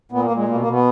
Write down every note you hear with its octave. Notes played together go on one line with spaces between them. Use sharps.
A#2 B3
A#3
A#2
G#3
B2 A#3
A#3
B2
B3